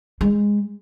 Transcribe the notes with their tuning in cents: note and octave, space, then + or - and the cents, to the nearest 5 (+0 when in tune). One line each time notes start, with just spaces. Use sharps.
G#3 -15